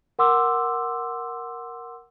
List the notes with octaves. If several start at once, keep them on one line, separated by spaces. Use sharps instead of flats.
A#4 F#5 C6 D6 E6